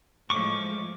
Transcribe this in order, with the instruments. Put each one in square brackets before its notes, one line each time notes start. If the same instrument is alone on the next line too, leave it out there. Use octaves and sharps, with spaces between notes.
[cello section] A2 F3 G#3 [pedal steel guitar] C#6 D6